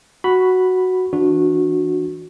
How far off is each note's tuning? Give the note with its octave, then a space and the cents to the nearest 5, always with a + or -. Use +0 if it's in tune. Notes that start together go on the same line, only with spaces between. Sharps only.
F#4 +0 B5 +0
E3 +0 D4 +0 F#4 -20